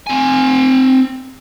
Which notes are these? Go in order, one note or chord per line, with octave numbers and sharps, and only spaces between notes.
C4 G#5